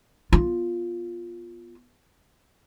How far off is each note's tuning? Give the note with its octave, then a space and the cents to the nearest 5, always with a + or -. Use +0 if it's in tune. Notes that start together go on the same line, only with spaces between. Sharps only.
B3 -20 F4 +0